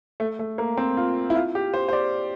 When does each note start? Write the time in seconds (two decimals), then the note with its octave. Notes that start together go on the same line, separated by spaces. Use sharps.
0.20 A3
0.39 A3
0.58 A#3
0.77 C4
0.97 F4
1.30 E4
1.35 F4
1.55 G4
1.74 C5
1.88 C5
1.93 D5